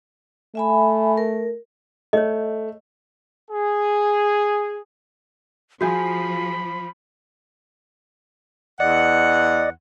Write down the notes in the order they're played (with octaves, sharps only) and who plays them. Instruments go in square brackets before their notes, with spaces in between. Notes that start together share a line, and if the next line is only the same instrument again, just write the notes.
[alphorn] A3 [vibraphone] E5 G#5 B5
[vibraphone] A#4
[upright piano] A3 [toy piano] C#5 D#5
[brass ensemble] G#4
[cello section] F3 [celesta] F#4 G6 [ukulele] G#4 F5 G#5 [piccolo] B5
[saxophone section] E2 F#5 [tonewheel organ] D5 D#5